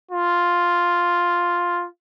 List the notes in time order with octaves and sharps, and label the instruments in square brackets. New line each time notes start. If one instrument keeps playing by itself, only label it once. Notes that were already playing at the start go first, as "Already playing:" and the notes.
[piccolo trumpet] F4